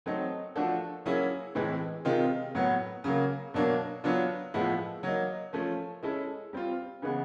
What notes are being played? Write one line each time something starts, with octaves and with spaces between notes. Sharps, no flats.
F#3 A3 C4 D#4
F3 A3 D4 F#4 A4
F#3 A#3 C#4 E4 G#4
A2 E3 G#3 C4 E4
C3 D#3 G#3 C4 F4
A2 F#3 B3
C#3 F#3 A#3
B2 F#3 A#3 D4
F#3 B3 D4 F4
A2 F3 G#3 B3 E4
F#3 A#3 D#4
F3 A3 C#4
G#3 C#4 E4 A4
G3 C4 F4
C#3 E3 G#3 B3